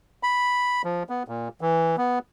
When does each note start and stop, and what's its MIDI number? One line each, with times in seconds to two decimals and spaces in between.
0.23 0.82 83
0.84 1.03 53
1.09 1.23 59
1.28 1.48 46
1.61 1.96 52
1.97 2.19 59